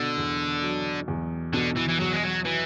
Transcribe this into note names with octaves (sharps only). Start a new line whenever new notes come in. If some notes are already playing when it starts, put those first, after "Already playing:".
Already playing: B2 D3
E2
F#3
E2
B2 D3
E3
E3
E2 F#3
G#3
F#3
E3 F#3